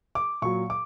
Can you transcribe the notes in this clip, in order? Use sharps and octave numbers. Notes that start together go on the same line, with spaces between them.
D6
A#2 F#3 C#6
D6